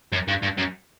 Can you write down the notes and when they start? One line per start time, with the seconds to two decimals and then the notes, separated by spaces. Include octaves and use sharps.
0.12 F#2
0.28 G2
0.42 G2
0.57 F#2